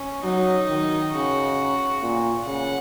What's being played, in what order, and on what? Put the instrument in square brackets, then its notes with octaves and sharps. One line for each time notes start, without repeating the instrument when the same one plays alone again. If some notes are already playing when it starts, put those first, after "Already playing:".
Already playing: [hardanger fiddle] C#4
[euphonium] F#3 [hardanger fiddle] D#4
[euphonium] D#3
[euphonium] C#3 [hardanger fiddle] F#4
[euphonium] A#2
[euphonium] C#3 [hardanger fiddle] F#5